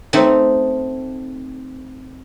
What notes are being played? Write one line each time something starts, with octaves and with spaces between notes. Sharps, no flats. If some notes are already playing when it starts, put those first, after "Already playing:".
A3 C4 D#4